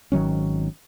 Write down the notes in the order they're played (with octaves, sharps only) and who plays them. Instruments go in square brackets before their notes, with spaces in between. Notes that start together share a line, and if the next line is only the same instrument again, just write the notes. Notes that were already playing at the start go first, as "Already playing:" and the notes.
[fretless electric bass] G#1 D#3 F#3 C#4